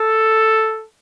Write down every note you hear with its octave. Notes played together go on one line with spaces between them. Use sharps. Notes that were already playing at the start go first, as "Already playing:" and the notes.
Already playing: A4